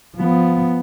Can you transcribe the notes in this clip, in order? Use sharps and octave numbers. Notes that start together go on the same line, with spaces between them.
F3 B3